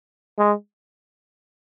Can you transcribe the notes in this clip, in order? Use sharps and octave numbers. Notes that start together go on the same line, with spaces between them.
G#3